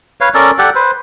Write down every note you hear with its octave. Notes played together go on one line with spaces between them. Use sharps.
B4 C#5 F5
C#4 A4 A#4 D5
G4 A4 D5 F#5
B4 C5